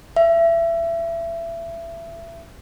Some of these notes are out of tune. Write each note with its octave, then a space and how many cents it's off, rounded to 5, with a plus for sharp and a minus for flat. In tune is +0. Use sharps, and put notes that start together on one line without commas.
E5 +25